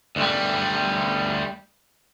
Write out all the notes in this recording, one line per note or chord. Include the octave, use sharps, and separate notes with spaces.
D2 G3